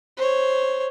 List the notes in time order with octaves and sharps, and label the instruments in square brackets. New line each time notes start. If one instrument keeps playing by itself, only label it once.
[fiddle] C5 C#5